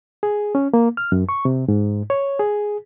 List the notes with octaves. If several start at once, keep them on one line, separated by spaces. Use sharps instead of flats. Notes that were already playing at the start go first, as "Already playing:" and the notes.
G#4
C#4
A#3
F6
F#2
C#6
C3
G#2
C#5
G#4